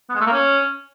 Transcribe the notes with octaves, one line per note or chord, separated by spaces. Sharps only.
B3
G#3
A3
A#3
C#4